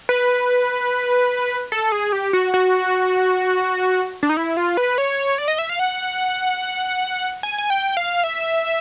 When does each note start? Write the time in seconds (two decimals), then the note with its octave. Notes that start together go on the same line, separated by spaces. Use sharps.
0.09 B4
1.72 A4
1.92 G#4
2.13 G4
2.33 F#4
2.54 F#4
4.23 D4
4.29 D#4
4.37 E4
4.57 F4
4.77 B4
4.98 C#5
5.38 D5
5.48 D#5
5.59 E5
5.69 F5
5.79 F#5
7.43 G#5
7.58 G#5
7.70 G5
7.97 F5
8.24 E5